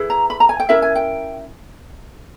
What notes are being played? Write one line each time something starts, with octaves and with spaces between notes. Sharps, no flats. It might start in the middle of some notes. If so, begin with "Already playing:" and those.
Already playing: E4 G#4 B4
A#5
B5
A#5
G#5
G5
C#4 E4 A#4 E5
G#5
G5